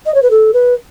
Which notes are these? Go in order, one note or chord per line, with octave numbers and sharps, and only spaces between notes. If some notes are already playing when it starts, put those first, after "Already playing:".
D#5
C#5
B4
A4
B4